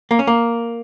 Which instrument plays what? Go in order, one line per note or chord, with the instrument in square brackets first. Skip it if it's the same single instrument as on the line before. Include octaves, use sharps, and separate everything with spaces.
[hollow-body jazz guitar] A#3
C#4
A#3